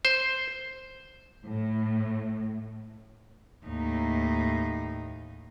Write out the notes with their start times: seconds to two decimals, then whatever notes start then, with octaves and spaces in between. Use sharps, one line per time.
0.05 C5
1.46 A2
3.65 D#2 A2 D#4